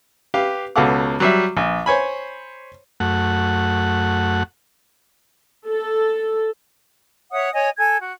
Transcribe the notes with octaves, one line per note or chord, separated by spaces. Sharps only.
G4 B4 F5
C#2 B2 A4 F5 F#5 D6
F#3 G3 E5
A#1
C5 C#5 G#5 B5
F#2 A3 F#5
A4
C#5 E5 F#5 D#6
C#5 D#5 G#5
A4 G#5 G#6
F#4